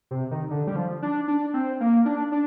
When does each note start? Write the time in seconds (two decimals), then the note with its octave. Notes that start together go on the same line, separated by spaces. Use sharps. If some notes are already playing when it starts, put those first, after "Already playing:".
0.11 C3
0.31 D#3
0.51 D3
0.67 G3
0.76 F3
1.02 D4
1.28 D4
1.54 C4
1.80 A#3
2.05 D4
2.32 D4